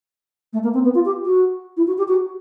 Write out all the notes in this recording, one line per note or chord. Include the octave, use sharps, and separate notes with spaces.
A3
A#3
C4
B3
F4
G4
F#4
E4
F#4
G4
F#4